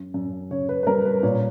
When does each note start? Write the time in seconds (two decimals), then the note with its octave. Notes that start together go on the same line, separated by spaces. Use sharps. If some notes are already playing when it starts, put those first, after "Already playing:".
Already playing: F#2
0.14 F#2
0.51 C#3 C#5
0.69 B4
0.83 B4
0.87 G3 A#4
1.05 B4
1.23 A#2 C#5